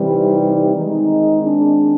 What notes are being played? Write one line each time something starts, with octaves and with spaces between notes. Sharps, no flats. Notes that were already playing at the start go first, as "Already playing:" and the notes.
Already playing: C3 E3 G3
D#4
D#3 G#3 C4 D#4
D4